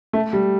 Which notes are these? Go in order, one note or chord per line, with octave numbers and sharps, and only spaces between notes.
A3
G3